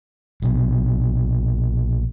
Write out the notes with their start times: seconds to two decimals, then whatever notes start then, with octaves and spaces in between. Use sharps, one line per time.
0.42 A#1 B2